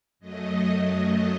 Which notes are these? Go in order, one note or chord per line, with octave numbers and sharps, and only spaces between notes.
F#2 F#3 A3 D#5